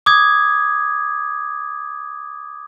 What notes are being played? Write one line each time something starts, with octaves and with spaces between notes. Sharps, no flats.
D6 D#6 G#6